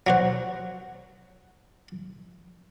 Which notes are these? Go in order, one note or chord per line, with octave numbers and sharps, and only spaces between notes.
F#3 F#4 C5